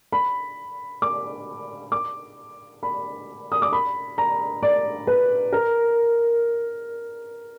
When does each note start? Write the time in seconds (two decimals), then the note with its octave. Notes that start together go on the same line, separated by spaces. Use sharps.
0.12 B5
1.02 D6
1.92 D6
2.83 B5
3.52 D#6
3.62 D6
3.73 B5
4.18 A#5
4.63 D5
5.07 B4
5.53 A#4